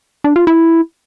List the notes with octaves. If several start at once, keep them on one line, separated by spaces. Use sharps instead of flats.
D4
F4
E4